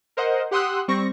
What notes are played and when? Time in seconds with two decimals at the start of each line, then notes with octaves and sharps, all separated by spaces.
0.17 A#4 C5 D#5 F#5
0.51 G4 F#5 C6 D#6 E6 F#6
0.88 G3 C4 C#6 A#6